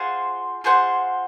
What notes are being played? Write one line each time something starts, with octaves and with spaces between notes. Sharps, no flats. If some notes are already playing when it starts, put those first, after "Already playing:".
Already playing: F4 G#4 C5 F#5
F4 G#4 C5 F#5